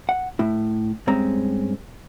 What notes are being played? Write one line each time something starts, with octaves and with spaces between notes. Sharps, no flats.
F#5
A2 E4
G2 G#3 C4 C#4 A#5